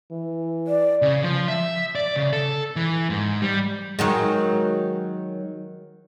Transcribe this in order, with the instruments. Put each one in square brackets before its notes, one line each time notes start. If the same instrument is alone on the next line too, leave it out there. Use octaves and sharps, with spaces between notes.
[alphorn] E3
[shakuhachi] D5
[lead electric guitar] C#3
F3
E5
D5
C#3
A4
E3
G#2
G3
[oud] D#3 F#3 G#3